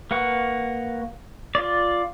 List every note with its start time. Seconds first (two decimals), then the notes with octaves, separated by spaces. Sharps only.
0.11 A#3 B4 F#5 C#6
1.55 F4 D5